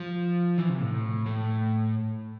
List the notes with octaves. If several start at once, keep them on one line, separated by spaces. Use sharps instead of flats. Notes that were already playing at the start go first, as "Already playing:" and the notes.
Already playing: F3
E3
C3
A2
A2